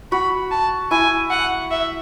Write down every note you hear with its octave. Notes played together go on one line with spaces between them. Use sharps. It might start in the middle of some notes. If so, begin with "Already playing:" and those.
F#4 B5
A5
E4 G#5
F#5
E5